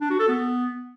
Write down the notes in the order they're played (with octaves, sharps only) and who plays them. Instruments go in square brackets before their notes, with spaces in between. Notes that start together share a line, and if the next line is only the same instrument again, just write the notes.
[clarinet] D4
F#4
A4
B3